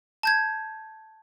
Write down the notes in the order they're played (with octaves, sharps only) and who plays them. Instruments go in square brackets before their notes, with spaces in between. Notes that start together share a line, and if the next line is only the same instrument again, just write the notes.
[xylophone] A5 G6 G#6